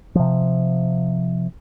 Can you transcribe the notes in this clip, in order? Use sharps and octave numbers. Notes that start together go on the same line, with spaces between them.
C3 F3